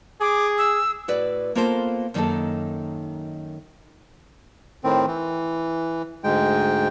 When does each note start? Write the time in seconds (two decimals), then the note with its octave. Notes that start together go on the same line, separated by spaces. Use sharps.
0.21 G#4 D6
0.58 E6
1.08 A2 F#4 B4 D5
1.55 A#3 B3 F4 A4 A#4 C5
2.14 F#2 D#3 A#3 D4 D#4 A4
4.84 A2 D#3 C4
5.07 E3
6.24 D2 G#2 G#3 G5